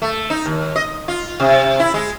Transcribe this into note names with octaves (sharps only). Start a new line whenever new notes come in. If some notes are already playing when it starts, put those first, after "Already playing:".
A3
D#4
D#2
D#5
F4
C3
E4
G#3